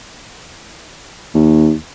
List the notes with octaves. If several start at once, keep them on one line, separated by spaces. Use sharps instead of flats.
D#2